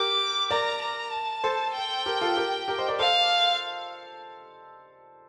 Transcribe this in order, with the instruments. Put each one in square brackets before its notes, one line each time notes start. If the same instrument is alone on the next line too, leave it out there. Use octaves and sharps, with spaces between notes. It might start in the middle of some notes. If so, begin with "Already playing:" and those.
Already playing: [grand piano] G4 A#4 [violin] D6
[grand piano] A#4 D5 [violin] A#5
[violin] A#5
A5
[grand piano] A4 C5
[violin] G5
[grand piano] G4 A#4
F4 A4
G4 A#4
G4 A#4
C5 D#5
A#4 D5
[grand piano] A4 C5 [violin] F5